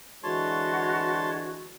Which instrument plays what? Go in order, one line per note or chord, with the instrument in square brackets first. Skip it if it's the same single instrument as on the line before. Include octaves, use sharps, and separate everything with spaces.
[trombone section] D3 E3 G#3 [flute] F#4 [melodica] C#5 A5 C6